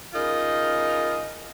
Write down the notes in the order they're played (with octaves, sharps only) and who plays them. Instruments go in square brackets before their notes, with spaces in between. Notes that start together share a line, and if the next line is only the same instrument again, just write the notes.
[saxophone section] C#3 D#4 F4 A#4